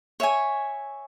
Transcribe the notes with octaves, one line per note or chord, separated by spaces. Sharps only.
C#5 E5 G#5